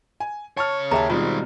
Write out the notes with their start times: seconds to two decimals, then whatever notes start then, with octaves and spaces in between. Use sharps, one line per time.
0.20 G#5
0.57 C#3 C#5 A5 C#6 F6
0.91 D#2 G#4 E5 A5 A#5
1.10 B2 D#3 G3 G#3 C4 F4